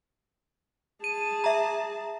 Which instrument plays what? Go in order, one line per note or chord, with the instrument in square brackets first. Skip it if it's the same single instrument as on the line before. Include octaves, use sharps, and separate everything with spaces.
[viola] G#4 A5 [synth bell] D#7
[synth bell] E5 A#5